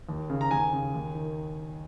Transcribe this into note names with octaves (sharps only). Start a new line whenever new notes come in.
D#2
C#3
A#5
D#2 G#5
C#3
D#2
D#3